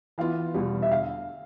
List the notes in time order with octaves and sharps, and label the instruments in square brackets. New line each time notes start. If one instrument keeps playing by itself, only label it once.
[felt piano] E3 B3 F4 [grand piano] F5
[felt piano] E2 B2 G3
[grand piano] E5
[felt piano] D3 [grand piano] F5